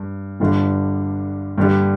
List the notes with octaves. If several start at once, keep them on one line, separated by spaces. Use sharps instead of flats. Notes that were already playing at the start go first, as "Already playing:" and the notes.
Already playing: G2
G1 G2 D3
G2 D3 G3